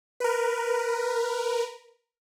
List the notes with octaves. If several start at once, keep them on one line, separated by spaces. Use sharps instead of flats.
A#4 B4